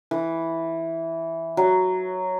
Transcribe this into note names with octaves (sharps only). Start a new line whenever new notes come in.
E3
F#3